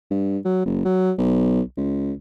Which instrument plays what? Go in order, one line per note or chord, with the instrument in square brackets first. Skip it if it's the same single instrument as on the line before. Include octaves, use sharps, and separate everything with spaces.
[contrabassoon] G2
F#3
F#1
F#3
B1
C#2